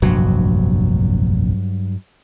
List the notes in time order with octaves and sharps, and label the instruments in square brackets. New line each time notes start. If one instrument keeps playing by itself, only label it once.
[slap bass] F1 A#1 [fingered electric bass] G2 F#3